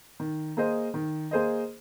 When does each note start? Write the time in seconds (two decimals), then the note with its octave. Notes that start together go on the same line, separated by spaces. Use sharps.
0.20 D#3
0.57 A#3 G#4 C5 D#5
0.94 D#3
1.31 A#3 G#4 C5 D#5